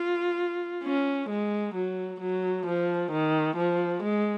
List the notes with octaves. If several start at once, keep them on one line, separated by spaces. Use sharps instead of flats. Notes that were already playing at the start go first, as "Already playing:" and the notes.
Already playing: F4
C#4
G#3
F#3
F#3
F3
D#3
F3
G#3